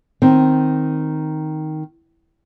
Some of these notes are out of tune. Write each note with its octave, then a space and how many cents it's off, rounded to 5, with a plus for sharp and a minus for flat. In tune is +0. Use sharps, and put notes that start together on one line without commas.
D#3 +0 C4 +0